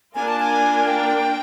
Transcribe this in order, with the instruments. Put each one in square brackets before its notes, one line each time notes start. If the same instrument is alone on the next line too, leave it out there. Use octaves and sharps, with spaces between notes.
[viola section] A#3 D4 F4 A#4 D5 [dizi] G#5
[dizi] A5
G#5
G5